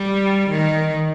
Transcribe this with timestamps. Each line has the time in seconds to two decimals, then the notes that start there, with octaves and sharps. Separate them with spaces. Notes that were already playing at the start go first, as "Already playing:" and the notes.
Already playing: G3
0.50 D#3